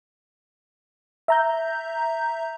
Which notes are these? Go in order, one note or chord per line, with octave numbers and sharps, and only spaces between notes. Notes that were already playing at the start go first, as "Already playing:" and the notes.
E5 A#5 G6